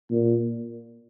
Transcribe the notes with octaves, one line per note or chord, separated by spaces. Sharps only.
A#2